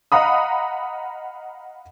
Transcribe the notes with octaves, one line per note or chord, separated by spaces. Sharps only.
D#5 F5 F#5 A#5 B5 D#6